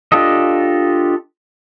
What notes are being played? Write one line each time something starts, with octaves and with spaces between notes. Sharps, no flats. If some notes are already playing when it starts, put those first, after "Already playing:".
D4 F4 G4 A4 D#5